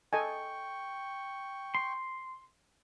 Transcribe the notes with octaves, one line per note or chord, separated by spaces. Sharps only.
A4 D#5 G5 G#5 C#6
C6